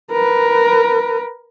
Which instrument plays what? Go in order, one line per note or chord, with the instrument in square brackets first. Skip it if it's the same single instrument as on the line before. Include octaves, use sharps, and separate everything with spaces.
[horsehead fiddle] A#4 B4